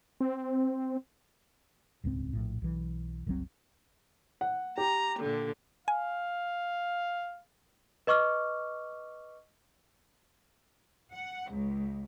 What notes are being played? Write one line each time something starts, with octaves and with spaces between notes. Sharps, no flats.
C4
D#1 C#2 G#2 C4
A#1 A2
B1 E3
F#1 C2 F#3 C4
F#5
G4 A#5
A#2 D3
F5 G#5
B4 D#5 C#6 D6 F6
F#5
C#2